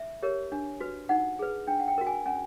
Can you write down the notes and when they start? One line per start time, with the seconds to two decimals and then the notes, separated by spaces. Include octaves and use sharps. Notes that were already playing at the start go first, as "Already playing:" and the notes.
Already playing: E5
0.23 G4 A#4 C#5
0.52 D4
0.80 F#4 B4
1.09 D#4 F#5
1.39 G#4 B4
1.67 D4 G5
1.80 F#5
1.88 G5
1.98 F#4 A#4
2.07 G#5
2.26 C#4 G#5